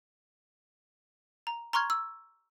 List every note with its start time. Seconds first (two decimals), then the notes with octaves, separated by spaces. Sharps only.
1.47 A#5
1.73 A#5 C6 C#6 F6 G#6
1.90 E6